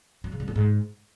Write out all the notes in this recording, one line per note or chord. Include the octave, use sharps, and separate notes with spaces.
F#3
C#3
G3
F#2
G#2